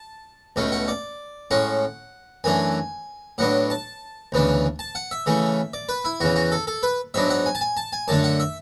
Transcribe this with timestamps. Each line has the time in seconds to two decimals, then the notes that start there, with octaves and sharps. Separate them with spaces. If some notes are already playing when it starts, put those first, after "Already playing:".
Already playing: A5
0.56 C#2 B2 A3 C#4
0.72 F#5
0.88 D5
1.51 A2 G#3 C#4 F#5
2.44 F#2 E3 A3 D4 G#5
3.38 A2 F#3 B3 D4 F#5
3.70 A5
4.32 D2 C#3 E3 B3 D4
4.79 A5
4.95 F#5
5.11 E5
5.26 C#3 E3 A3 C#4
5.74 D5
5.89 B4
6.05 E4
6.20 E2 C#3 E3 F#4
6.36 F#4
6.52 A4
6.67 A4
6.83 B4
7.14 G#2 F#3 B3 D4 E5
7.30 F#5
7.46 G#5
7.55 A5
7.61 G#5
7.77 A5
7.93 G#5
8.08 F#2 D3 A3 D4 A5
8.24 F#5
8.40 E5